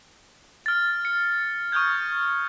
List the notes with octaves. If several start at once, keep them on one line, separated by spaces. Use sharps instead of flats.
F6 A6
C#7
C#6 D#6 F6 G6 G#6